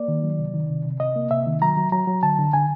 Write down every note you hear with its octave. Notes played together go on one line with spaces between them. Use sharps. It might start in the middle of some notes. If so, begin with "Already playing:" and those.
Already playing: A#3 D5
D#3
F#3
C3
D#3
C3
C3
C3 D#5
A#3
C3 E5
D#3
F#3 A#5
F#3
F#3 A#5
F#3
D3 A5
D3
D3 G#5